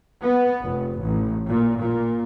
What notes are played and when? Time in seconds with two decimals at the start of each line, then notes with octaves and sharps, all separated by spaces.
0.20 B3
0.61 F1
1.02 A1
1.47 A#2
1.79 A#2